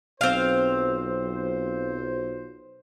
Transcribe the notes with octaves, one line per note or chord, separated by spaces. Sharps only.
B1 F#3 C4 F4 C5 F5